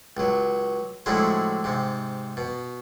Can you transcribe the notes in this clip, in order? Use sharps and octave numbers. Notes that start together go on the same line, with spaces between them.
C#2 F#3
A2 D3 F3 F#3 G#3 E4
G#2 C3
B2